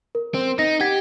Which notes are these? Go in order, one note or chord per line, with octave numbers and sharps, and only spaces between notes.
A#4
C4
D#4 A#6
G4 F#5 G#6 B6